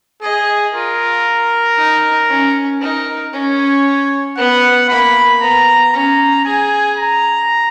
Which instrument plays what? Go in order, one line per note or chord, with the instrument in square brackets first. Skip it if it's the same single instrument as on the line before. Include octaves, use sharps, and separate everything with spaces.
[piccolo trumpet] G#4 [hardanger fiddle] D#5
[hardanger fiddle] F4 [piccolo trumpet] A#4
[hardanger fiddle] D#4
C#4
[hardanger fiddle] D#4 [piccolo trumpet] A#4
[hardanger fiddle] C#4 [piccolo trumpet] C#5
[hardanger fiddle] B3 [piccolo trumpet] F#5
[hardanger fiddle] A#3 [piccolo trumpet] B5
[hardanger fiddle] B3 [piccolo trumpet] A#5
[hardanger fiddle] C#4 [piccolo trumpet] A#5
[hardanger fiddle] G#4 [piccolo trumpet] G#5
[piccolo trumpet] A#5